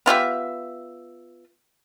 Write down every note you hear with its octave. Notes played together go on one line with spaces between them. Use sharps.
B3 F4 G4 E5